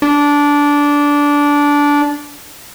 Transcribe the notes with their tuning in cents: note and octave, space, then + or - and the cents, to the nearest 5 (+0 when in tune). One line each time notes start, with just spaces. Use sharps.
D4 -15